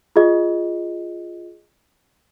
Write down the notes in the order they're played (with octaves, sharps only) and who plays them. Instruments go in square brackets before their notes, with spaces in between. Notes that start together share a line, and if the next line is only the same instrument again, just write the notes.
[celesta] F4 G#4 D#5